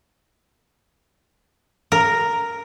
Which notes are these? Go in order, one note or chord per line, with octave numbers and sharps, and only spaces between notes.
A#4